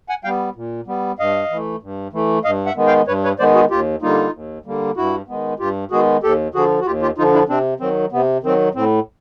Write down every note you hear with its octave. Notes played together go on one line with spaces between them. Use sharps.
F#5 G#5
G3 B3 F5 G5
A#2
G3 B3
G2 D#5 F5
E3 A3
G2
E3 A3
G2 D#5 F5
E5 F#5
D#3 G#3 B3
F5 G5
G2 B4 C#5
B4 C#5
D#3 G#3 B3 C5 D5
F#4 G#4
D#2 F4 G4
D3 G3 A#3 D#4 F4
D#2
D3 G3 A#3
G2 E4 F#4
D#3 G#3 B3
G2 F4 G4
D#3 G#3 B3 F#4 G#4
D#2 G4 A4
D3 F3 F#4 G#4
F#4
D#2 F4 G4
F4 G4
D3 F3 D#4 F4
D4 E4
C3 C4 D4
D#3 F#3 C4
C3 B3
D#3 F#3 C4
A2 C4